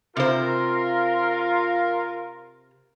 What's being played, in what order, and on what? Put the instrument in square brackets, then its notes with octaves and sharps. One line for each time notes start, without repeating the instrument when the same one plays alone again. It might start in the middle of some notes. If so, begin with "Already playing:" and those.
[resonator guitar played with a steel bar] C3 C5 [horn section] F4 A#4